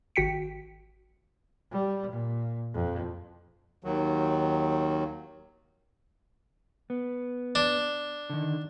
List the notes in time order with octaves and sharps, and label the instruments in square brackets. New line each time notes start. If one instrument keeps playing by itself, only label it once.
[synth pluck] G#1 F#4 G5 B6 C#7
[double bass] G3
A#2
F2
[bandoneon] D#2 D#3 F#3
[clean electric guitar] B3
[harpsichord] D4
[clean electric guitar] D3 D#3